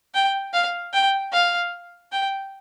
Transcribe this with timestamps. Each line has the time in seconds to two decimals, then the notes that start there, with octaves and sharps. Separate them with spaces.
0.14 G5
0.53 F5
0.93 G5
1.33 F5
2.12 G5